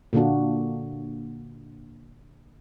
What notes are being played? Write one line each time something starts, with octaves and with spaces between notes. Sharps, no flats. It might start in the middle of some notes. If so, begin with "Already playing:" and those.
A#2 D3 A#3 D4 F#4